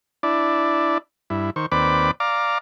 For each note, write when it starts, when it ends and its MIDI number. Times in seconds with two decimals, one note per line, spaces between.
0.23 0.98 62
0.23 0.98 64
0.23 0.98 74
1.30 1.50 43
1.30 1.50 64
1.56 1.66 51
1.56 1.66 72
1.56 1.66 85
1.72 2.11 39
1.72 2.11 60
1.72 2.11 71
1.72 2.11 74
1.72 2.11 83
1.72 2.11 86
2.20 2.58 74
2.20 2.58 77
2.20 2.58 82
2.20 2.58 86